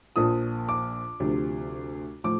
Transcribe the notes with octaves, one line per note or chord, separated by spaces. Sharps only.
A#1 A#2 F3 D#6
D6
D2 C3 F3
A2 F3 D6